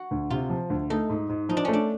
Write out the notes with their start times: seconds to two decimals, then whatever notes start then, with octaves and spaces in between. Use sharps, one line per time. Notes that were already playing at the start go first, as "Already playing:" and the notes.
Already playing: F#4
0.11 D2
0.30 C3 F4
0.50 F3
0.70 D2
0.90 A3 D#4
1.09 G#2
1.29 G#2
1.49 F3 D#4
1.57 D4
1.65 A3 C#4
1.73 D4